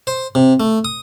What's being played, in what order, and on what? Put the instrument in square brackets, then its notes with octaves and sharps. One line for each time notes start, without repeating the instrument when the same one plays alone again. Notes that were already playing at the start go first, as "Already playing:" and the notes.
[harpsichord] C5
C3
A3
D#6